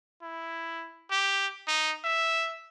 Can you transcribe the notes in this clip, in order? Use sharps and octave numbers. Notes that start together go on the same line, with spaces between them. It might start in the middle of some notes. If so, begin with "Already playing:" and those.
E4
G4
D#4
E5